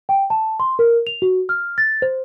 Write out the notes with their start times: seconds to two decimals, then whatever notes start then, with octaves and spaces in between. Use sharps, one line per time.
0.09 G5
0.30 A5
0.60 C6
0.79 A#4
1.07 F7
1.22 F#4
1.49 F6
1.78 A6
2.02 C5